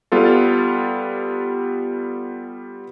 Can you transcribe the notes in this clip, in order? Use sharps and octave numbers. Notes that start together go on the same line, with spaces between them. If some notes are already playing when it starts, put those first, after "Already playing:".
G3 B3 F4 A4